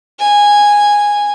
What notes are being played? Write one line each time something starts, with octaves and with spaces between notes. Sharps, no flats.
G#5